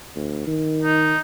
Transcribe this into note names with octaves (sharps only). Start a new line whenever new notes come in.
D2
D#3
D#4